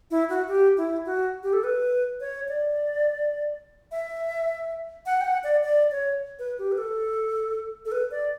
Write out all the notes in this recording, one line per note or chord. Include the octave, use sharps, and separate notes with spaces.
E4
F#4
G4
E4
F#4
G4
A4
B4
C#5
D5
E5
F#5
G5
F#5
D5
D5
C#5
B4
G4
B4
A4
A4
B4
D5